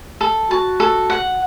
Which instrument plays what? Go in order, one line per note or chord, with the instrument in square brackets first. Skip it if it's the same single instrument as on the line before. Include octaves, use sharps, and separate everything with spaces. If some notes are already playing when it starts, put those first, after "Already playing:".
[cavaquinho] A4
[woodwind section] F#4 [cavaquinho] A5
[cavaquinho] A4
F#5